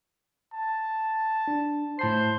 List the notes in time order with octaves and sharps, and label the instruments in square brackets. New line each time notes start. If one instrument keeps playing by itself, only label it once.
[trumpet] A5
[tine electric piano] D4
[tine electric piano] A2 A5 C7 [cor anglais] C5